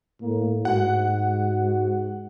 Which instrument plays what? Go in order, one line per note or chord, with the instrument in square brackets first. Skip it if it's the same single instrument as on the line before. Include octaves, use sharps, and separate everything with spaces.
[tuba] A2 [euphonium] A#3
[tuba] G#2 [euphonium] F#4 [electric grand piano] F#5